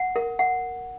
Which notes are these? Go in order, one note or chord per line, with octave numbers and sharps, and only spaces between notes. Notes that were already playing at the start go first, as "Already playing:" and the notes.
Already playing: F#5
A#4
F#5